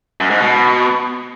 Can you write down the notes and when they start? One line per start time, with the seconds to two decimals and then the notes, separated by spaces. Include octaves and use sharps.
0.20 F#2
0.30 G#2
0.40 B2